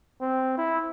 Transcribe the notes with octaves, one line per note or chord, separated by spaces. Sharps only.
C4
E4